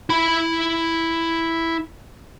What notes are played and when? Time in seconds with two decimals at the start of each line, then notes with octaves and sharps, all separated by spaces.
0.09 E4 B5